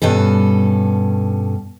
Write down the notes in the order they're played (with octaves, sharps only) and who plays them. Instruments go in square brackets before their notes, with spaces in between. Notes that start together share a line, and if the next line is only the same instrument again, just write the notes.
[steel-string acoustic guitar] G2 B2 C#4 A4